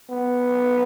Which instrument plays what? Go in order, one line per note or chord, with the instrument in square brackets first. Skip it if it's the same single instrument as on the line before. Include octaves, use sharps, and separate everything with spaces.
[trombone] B3